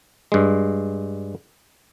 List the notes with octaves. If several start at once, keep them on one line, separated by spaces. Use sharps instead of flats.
G2 G#3